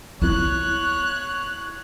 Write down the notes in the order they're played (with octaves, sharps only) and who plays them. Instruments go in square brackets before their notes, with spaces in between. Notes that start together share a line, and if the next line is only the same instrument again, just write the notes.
[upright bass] B3 E4 [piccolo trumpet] C#5 [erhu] F#6